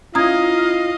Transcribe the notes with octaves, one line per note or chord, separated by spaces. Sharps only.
C#4 E4 F4 D#5 F5 A#5 D#6 G#6